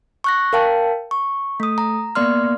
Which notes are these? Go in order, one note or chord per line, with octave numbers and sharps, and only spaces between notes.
C#6 F#6 A#6
A#4 F5 G5 A5
C#6
A3 D#6
A#5
A#3 B3 D5 C6 F6